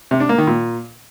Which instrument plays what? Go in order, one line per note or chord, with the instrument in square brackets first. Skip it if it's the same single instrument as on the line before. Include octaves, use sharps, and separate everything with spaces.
[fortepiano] C3
D4
A#3
D#3
A#2